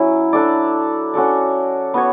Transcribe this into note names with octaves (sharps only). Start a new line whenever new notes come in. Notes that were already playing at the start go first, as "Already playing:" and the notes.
Already playing: F#3 C#4 E4
D4 A4 D5
C#4 F#4 A4 D5
B3 F#4 C#5